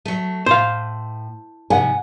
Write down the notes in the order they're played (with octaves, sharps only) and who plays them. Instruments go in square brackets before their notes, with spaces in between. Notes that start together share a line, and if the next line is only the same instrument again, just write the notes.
[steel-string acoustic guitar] F#3 A3
[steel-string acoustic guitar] A2 [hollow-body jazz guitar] C5 F5
[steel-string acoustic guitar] G#2 C3 F3 [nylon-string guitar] F#5 G#5